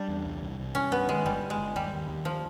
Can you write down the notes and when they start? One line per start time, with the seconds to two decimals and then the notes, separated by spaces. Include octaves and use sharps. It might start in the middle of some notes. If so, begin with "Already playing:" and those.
Already playing: G3 D4
0.08 E2
0.25 C2
0.42 C2
0.59 C2
0.75 G2 C#4
0.92 G2 B3
1.08 D#3 G#3
1.25 G1 G3
1.42 G1
1.50 G#3
1.58 G1
1.76 D#2 G3
1.93 D#2
2.09 D#2
2.25 F3